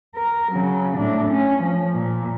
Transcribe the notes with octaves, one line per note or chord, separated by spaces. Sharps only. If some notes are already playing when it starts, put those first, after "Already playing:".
A#4
C#3 F#3
A2 D4
C#4
F3
A#2